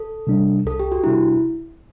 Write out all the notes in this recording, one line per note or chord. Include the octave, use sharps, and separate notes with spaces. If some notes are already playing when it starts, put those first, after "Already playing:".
Already playing: A4
C3 G3 D4
C2 A4
G4
F#4
C3 G3 D4 E4